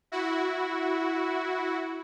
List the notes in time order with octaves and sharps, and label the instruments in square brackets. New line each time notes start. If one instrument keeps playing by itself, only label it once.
[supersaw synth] E4 F#4